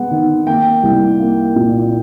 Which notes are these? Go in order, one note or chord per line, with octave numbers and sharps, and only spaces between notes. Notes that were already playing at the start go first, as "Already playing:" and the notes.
Already playing: G#3 B3 F#5
D#3
A#3 G5
C2
A#3
A#2